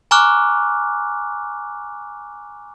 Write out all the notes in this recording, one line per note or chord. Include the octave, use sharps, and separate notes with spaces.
G#5 A#5 C#6 D6 F6 F#6